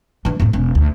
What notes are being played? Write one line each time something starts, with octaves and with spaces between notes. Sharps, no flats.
E3 D4
F2 A2
E1 C#4
D2